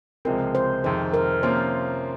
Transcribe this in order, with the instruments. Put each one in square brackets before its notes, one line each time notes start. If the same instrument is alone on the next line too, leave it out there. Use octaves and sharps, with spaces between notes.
[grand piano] C#2 C3 F3 G#3 C4 [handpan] A#4
[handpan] C5
[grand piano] F2 C3 D#3 G#3 [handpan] C5
[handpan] A#4
[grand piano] C3 F3 A#3 C#4 F4 [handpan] C5